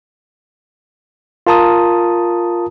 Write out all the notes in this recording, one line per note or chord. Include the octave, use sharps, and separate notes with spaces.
F4 A#4 A5 A#5 D#6